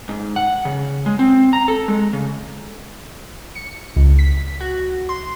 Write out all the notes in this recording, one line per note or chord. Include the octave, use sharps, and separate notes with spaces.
G#2
F#5
C#3
G#3
C4
A#5
A4
G#3
C#3
C#7
C#2
B6
F#4
C6